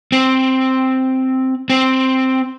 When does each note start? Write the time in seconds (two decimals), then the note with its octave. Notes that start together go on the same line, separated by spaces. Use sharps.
0.12 C4
1.70 C4